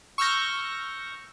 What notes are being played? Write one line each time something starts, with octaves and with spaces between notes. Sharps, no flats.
C#6 E6 F6 G6 A#6